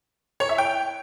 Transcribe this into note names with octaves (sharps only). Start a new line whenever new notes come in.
C#5
E5
G5